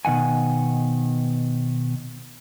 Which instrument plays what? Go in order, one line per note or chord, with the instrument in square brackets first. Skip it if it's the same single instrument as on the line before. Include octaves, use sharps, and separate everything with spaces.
[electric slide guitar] B2 D#3 F#5 G#5